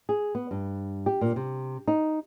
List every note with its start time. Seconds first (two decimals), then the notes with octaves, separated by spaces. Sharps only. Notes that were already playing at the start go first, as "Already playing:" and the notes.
0.09 G#4
0.35 B3
0.51 G2
1.06 G4
1.21 A#2
1.36 C3
1.87 D#4